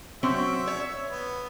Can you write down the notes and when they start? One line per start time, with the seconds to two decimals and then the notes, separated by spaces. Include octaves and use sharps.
0.23 F#3 C4 C#4 E5
0.68 C#5
1.09 B3